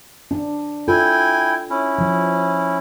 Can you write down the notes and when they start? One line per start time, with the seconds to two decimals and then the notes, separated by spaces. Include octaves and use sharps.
0.31 D4
0.88 E4 F4 A4 G5 G#5
1.70 C#4 E4
1.98 F3